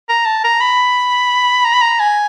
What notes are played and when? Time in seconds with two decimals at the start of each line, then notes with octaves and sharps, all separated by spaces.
0.09 A#5
0.26 A5
0.44 A#5
0.61 B5
1.65 A#5
1.73 B5
1.81 A#5
2.00 G#5